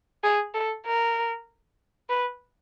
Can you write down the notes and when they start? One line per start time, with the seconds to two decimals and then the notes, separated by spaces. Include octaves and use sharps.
0.24 G#4
0.54 A4
0.86 A#4
2.09 B4